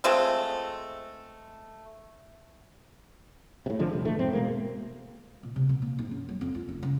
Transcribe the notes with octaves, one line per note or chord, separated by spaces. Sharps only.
G#3 A3 C4 F4
A2 C3
G#1 D3 F3 G#3
F1 C2
A#1 A2 E3 A3
E1 G#2 C4
B2 G#3 A#3
A#2
C3
B2
A#3
G#2
F#2
F#3
F2
F4
F#1
C#3